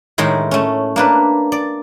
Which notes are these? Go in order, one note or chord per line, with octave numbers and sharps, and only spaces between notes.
A2 D#3 G#3 E4
A3 C#4
A#3 D4 B4
D5